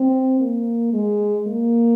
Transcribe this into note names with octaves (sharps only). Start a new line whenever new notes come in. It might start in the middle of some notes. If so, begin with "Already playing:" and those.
Already playing: C4
A#3
G#3
A#3